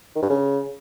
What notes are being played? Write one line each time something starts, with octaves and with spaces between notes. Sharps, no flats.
D#3
G2
C#3